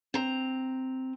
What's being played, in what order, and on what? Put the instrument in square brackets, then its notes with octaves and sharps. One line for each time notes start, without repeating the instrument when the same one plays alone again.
[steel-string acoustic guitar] C4 A#5